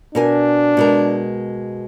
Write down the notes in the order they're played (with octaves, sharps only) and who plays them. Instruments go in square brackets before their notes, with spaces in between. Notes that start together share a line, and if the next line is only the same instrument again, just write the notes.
[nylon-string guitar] B2 A#4 G#5 [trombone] D4
[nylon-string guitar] B2 G#3 A#4